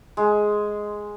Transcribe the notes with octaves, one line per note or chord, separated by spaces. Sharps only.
G#3